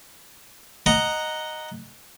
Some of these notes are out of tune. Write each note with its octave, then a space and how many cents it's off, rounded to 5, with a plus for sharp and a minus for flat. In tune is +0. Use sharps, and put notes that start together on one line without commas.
D#5 -5 F#5 +0 A#5 -5